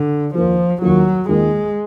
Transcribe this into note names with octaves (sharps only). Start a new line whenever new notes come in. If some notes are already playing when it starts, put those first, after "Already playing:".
Already playing: D3
D#2 D#3 F3 A#3 F4
D#2 D#3 F#3 A#3 F4
D#2 D#3 G#3 A#3 F4